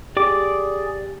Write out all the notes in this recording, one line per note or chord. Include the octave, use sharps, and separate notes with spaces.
G4 G#4 D5 D6